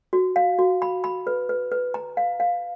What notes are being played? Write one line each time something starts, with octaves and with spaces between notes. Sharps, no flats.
F#4
F5
F#4
B5
B5
B4
B4
B4
A#5
F5
F5